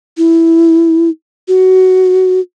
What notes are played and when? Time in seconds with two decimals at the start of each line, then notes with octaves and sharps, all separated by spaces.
0.18 E4
1.48 F#4